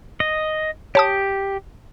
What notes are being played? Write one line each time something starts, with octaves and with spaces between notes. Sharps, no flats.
D#5
G4 C#5 A5 D#6